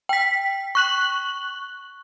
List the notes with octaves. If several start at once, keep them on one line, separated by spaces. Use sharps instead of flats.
G5 B6
C#6 F#6 F#7